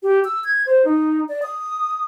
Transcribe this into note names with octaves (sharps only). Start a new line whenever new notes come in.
G4
E6
G#6
C5
D#4
D5
D#6